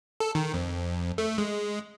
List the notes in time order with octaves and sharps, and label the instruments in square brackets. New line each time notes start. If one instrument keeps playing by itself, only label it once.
[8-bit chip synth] A4
D#3
F2
A3
G#3